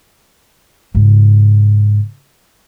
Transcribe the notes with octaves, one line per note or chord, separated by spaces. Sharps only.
G#2 C#3